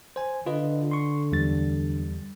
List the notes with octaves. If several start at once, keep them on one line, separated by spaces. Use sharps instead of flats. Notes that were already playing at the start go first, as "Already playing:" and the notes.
C5 G#5
D3 F4 B4 D#5
C6 C#6
E2 G3 A6